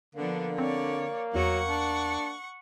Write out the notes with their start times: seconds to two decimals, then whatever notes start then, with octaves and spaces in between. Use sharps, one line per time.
0.15 D3 F3 A#3 B3 D4
0.58 C4 C#5 D5
1.34 E2 F#3 F#5 C#6
1.68 D4